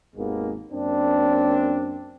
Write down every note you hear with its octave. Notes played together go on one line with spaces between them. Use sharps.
G#1 D#2 G#3 A#3 B3
F#2 A#3 C4 D4